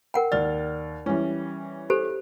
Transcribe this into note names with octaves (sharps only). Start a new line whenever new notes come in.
A#4 F#5 G5
D#2 D5 F6 A6
E3 G3 C#4
G4 A4 C5